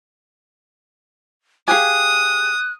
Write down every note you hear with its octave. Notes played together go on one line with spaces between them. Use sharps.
G4 G#4 F5 G5 G#5 D#6 F#6